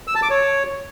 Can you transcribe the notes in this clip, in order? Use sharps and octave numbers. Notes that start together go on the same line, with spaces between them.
E6
A5
D6
C#5